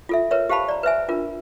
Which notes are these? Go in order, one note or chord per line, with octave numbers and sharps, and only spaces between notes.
F4 A4 E5
A#4 B4 C#5 E5
G4 C5 F5 A5 B5
D5 A#5
B4 C5 E5 G#5
D4 F4 A#4